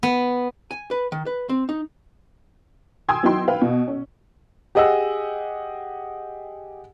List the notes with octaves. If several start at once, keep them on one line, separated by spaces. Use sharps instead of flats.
B3
G#5
B4
D#3
B4
C4
D#4
G5 G#5 C6 D#6 E6 G#6
F#3 B3 D#4 E4 G5 C6
B4 F5 G5
B2
C#4
G4 G#4 D#5 F#5 E6